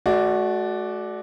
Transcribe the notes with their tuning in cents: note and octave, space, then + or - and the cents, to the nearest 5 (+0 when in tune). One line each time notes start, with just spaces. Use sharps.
A3 -40 F#4 +0 D5 +0